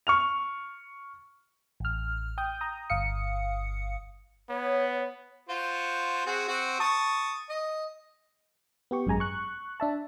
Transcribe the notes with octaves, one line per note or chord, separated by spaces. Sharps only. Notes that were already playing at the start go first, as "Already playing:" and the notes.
C#6 F6 F7
A1 F6
G5 D#6 G6
A#5 D#6
G1 F5 D#6 C#7
B3 C#5
F4 F#4 C5
C4 F#4 G#4
C4 F#4
A5 C#6 D#6
D#5
B3 G4 C#6
G#1 F#2 G#3 G#5 A#5
C#6 F#6
D4 E5 A5